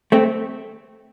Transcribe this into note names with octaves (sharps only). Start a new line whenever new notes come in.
A3 C4